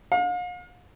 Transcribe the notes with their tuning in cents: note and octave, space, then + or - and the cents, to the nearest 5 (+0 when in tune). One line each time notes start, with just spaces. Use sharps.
F5 +40